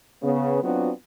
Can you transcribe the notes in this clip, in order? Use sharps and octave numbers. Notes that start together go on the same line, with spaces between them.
C#3 B3
F#3 B3 C4 D4 F4 F#4